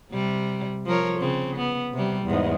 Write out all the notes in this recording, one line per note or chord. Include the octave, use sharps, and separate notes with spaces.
C3 G3
F3 A#4 C#5
C#3 C4
B3
C3 G3
E2 G#2